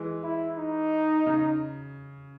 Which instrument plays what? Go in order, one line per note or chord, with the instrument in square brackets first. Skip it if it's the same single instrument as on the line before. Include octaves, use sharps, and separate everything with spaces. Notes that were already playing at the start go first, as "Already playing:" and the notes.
Already playing: [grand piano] E3 G#3
[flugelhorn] E4
D#4
[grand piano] C#3